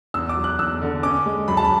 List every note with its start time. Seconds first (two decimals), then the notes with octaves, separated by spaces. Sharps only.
0.14 E2 E6
0.29 D6
0.37 F#3
0.44 F#6
0.59 E2 E6
0.82 D3
1.03 C#4 D6
1.26 G#3
1.48 F#2 B5
1.57 A5
1.65 B5